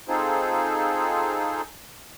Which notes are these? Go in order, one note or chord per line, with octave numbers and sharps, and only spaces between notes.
C4 D#4 F4 G#4 A4 C5